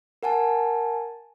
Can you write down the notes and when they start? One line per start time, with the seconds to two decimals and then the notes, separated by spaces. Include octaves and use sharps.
0.23 A#4 F#5 G#5 A5